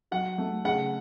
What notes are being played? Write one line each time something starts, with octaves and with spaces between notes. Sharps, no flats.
F#3 F#5
A3
C#3 F#5